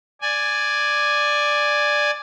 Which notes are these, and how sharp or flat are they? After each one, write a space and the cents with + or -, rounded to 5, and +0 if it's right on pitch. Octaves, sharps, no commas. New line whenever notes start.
D5 +5 G#5 +0